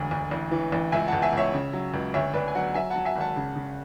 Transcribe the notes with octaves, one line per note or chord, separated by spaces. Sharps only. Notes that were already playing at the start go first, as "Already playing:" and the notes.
Already playing: E1 D2
D2
A1
E3
A1
C#2 E5 G#5
C#2 F#5 A5
E5 G#5
C#2 C#5 E5
C#3
F#3
C#2
D2 C#5 E5
D2 B4 D5
G#5
F#3 D5 F#5
F#3 E5 G#5
F#3 F#5 A5
E5 G#5
G#1 F#5 A5
C#3
C#3